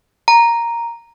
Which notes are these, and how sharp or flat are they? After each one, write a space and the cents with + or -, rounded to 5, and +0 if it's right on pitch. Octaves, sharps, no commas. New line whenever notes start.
A#5 +0